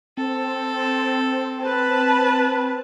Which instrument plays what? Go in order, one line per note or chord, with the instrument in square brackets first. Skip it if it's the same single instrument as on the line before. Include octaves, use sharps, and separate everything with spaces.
[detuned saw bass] C4 [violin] A4
[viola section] B4 A5